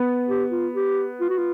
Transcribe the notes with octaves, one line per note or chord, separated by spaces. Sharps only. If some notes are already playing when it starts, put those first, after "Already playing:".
Already playing: B3
G4
F4
G4
F4
F#4
F4